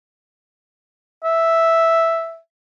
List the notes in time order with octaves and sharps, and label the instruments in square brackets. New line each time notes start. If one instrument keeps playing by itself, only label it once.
[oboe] E5